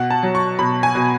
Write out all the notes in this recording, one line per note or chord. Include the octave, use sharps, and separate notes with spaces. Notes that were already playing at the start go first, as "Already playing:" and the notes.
Already playing: B2 F#5
A5
F#3
C#6
B2 B5
G#5
B2